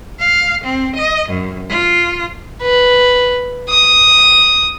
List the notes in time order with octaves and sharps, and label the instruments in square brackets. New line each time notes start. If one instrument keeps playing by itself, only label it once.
[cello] F5
C4
D#5
F#2
F4
[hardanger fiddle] B4
D#6